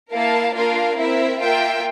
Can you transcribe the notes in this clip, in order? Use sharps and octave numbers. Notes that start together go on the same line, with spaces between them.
A#3 E4 A#4 F5 A5
A#3 D4 F4 A#4 F5
C4 E4 A#4 E5
A#3 F4 A#4 E5 G5